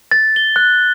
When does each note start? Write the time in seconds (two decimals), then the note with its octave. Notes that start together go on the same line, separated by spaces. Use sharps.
0.11 A6
0.36 G7
0.56 F#6